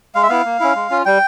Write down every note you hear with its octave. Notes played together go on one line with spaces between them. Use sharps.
G#3 F5
E5
B3 E4 F5
A#3
C#4 E4
G#3
C#4 F4
G3 G5